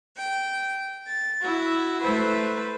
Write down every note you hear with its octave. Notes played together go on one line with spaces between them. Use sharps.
G5
A6
E4 F#4
A3 E4 B4 C5